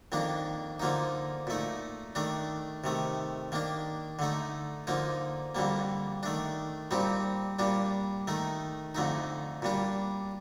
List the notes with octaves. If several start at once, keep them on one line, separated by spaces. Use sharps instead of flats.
F2 D#3 A#3 D4
D3 F3 A#3 D#4
A#2 A3 D#4
D#3 A3 D4
C3 D#3 A3
D#3 A#3 D4
D3 A3 D#4
D3 F3 A#3 D#4
F2 D3 G3 A#3
D#3 A3 D4
A#2 G3 C4 D#4
A#2 G3 D4
D#3 A3 D#4
F2 D3 A3 D#4
A#2 G3 D4